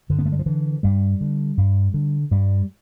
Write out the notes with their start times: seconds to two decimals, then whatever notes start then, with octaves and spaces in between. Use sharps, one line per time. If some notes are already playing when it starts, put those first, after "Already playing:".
0.09 G2 D3
0.19 B3
0.26 A3
0.32 G3
0.39 F3
0.46 D3 E3
0.83 G2 G3
1.21 D3
1.57 G2
1.94 D3
2.31 G2 G3